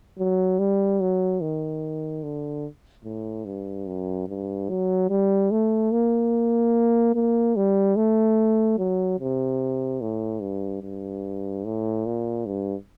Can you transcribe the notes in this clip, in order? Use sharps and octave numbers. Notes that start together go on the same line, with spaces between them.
F#3
G3
F#3
D#3
D3
A2
G2
F#2
G2
F#3
G3
A3
A#3
A#3
G3
A3
F#3
C3
A2
G2
G2
A2
A#2
G2